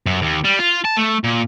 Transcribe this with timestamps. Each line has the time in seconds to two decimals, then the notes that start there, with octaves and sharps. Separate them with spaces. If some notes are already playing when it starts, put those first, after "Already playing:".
0.06 F#2
0.22 D#2
0.44 G3
0.59 F4
0.85 A5
0.97 A3
1.24 A#2